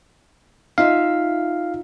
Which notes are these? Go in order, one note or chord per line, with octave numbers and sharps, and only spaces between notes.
D#4 F4 E5 F5